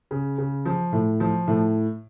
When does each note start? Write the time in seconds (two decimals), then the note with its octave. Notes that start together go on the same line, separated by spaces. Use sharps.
0.11 C#3
0.38 C#3
0.65 F3
0.92 A2
1.20 F3
1.47 A2